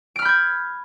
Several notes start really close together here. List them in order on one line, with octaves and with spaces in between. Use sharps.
D7 F6 B5 G6 G#6